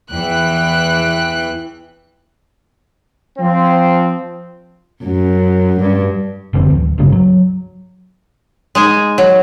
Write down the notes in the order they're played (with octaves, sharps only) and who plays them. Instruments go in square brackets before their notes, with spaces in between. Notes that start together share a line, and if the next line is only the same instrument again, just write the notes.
[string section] E2 E3 G5 F#6
[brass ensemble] F3 C4
[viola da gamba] F#2
G2
[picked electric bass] F#1 D3 E3 C4
D1
G#1 C#2 G2 C#3
F#3
[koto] G#3 D#4 G#5
F#3